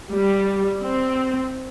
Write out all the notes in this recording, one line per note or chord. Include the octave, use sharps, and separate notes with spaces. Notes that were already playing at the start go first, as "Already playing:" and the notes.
G3
C4